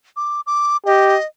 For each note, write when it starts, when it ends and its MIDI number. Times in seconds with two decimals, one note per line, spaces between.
0.16 0.41 86
0.46 0.77 86
0.86 1.17 67
0.86 1.25 75